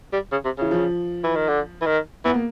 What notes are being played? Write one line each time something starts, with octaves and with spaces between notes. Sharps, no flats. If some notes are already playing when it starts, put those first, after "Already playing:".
G3
C#3
C3
C#3 E3
F3
E3
D#3
D3
E3
D#3
E3 B3
A#3